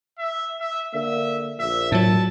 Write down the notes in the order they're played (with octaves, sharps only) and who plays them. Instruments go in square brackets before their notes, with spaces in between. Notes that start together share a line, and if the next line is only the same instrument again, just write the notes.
[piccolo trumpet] E5
E5
[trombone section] D3 A#3 [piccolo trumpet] E5
[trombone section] A#1 [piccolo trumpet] E5
[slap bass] A2 F#3 [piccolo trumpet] A5